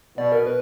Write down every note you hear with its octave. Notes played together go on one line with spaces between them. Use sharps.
B2 D5
A#4
B4